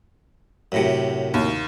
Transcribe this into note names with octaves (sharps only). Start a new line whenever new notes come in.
F#2 A2 C3
D#2